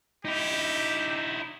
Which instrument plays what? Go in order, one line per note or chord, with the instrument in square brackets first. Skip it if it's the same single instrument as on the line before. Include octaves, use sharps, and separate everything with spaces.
[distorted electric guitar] D#4 E4 [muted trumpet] G4